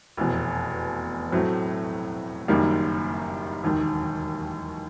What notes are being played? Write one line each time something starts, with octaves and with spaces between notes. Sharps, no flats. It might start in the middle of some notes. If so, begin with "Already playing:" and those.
F1 E2 B2
A2 F#3 A3 C4
F#1 F#2 D#3 G3 A#3
E1 D#2 D#3